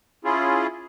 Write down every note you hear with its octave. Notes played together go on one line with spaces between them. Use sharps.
C#4 E4 F4 G#4